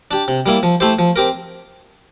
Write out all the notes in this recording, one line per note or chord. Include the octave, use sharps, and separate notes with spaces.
D4 G4
C3
G3 A#3 E4
F3
A3 E4 G4 C5
F3
C4 G4 A#4